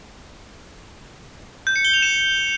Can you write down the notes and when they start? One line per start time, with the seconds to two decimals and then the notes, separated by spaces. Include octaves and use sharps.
1.67 G6
1.76 C#7
1.85 G7
1.94 F7
2.02 E7